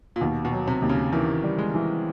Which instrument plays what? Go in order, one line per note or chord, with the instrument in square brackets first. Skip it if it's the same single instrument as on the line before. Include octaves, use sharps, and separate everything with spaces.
[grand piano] A#2
[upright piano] D#2 [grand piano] B2
[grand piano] B2
[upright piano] F#3
[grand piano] C3
[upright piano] D#2
[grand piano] C#3
[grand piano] D#3 [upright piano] E3
[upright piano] G3
[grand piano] G#3
[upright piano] E3